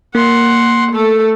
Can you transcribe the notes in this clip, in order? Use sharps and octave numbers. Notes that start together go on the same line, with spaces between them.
A#3 F#5 C6
A3 A4